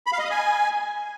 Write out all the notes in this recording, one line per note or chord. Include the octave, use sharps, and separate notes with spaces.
B5
F5
D#5
D#6
G#5